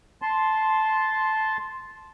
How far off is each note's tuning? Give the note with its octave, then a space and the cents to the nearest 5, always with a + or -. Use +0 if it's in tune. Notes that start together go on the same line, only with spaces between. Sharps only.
A5 -10 C6 +0